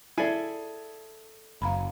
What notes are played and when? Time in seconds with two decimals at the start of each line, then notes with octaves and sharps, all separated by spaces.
0.18 E4 G#4 A4 D5 G#5
1.62 F#1 F5 A#5 B5